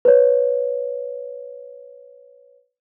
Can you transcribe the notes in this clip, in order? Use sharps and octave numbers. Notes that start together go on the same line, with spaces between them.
B4 C#5